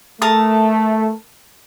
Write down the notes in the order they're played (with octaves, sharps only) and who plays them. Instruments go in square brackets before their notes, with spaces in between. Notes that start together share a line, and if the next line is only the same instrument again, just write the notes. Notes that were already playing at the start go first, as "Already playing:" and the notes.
[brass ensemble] A3 [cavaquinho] A#4 A5 D#6